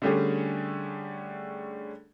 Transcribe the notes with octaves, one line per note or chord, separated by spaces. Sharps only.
D3 G3 A3 C#4 G4 G#4